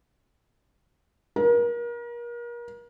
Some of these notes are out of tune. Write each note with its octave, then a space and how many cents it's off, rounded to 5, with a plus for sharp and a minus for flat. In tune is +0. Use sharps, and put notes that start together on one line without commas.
A#4 +35